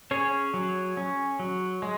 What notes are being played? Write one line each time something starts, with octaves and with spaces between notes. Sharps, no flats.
C#4 G#4 C#5
F#3
C#4
F#3
G#3